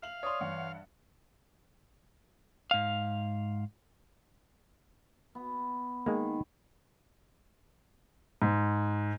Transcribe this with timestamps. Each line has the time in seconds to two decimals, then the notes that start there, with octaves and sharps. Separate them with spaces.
0.02 E5 F5 F#7
0.23 C#5 D5 C6 D#6
0.41 G2 E3 E5 F#5
2.71 G#2 F5
5.35 B3
6.06 D#3 G#3 A#3
8.42 G#2